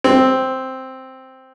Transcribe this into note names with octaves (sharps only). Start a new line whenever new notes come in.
C4